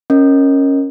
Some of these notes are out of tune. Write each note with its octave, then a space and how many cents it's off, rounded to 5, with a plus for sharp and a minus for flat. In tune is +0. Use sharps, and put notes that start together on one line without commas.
C#4 -10 A#4 +0 D#5 +10